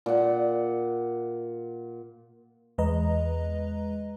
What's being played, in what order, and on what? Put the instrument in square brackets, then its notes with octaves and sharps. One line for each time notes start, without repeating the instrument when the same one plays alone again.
[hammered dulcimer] A#2 F#5
[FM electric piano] E2 G#3 B4 D#5 A#5